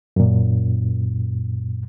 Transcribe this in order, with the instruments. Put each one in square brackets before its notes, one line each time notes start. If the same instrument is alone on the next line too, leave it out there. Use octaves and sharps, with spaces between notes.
[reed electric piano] F#2 A#2